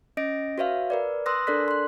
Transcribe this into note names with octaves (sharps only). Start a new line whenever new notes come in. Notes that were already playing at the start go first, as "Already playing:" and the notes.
C#4 D#5 A#6 D7
F#4 B4 C#5 E5 F5
A#4 B4 D5
B4 C6 D#6 E6 F#6 A#6
D4 A4 A#4 D5 F#6 B6
C6 F#6